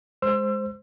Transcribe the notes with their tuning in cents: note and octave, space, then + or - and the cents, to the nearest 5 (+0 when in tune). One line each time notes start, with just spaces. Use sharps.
G#3 +0 C5 +0 E6 +30